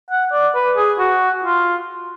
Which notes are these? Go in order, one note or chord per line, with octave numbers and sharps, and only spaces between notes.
F#5
D5
B4
G#4
F#4
F4